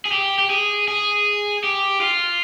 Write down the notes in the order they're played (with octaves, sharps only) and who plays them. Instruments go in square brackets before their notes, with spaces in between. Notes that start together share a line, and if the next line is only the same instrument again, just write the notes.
[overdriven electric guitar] G#4
G4
G4
G#4
G#4
G4
F4